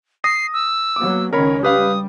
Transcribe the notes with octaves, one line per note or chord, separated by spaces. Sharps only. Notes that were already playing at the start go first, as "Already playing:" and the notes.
D#6 A#6 C7
E6
F#3 A#3 B3 D6
C#2 D#3 C#4 A#4 C#5 B5
G3 G4 B4 F5 D#6